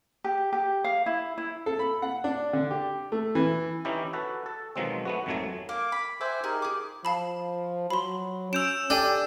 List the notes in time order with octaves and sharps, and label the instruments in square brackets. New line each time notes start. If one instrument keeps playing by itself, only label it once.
[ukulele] G4
G4
F5
E4
E4
[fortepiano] A4
B5
F#5
D4
D3
G4
A3
E3
[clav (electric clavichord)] E3 C#4 D#4 E4 G4
F#4 A4 B4
A4
B2 D#3 F3 F#3 G#3 C4
A3 B3 F#4
G#1 F2 D#3 F#3 A3 G#5
[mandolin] A#3 [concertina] D6
[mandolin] B5
[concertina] C5 E5 G#5 [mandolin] F#5 D6 E6
[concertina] D#4 G4 A#4 [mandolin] G#4
[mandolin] G#4 D6
[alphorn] F3 [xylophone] F5 A5 B5
[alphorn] F#3 [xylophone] B5 C6
[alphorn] C#4 [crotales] E6 G6 E7 [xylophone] D7 F7
[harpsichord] D4 [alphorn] G4 [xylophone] A4 G5 G#5